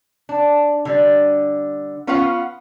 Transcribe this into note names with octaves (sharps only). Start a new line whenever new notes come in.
D4
D3 G3
B3 C#4 F4 B4 F5 F#5